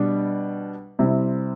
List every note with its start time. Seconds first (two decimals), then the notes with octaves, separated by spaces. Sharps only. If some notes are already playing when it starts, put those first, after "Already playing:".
Already playing: B2 G3 D4
0.99 C3 G3 C4 E4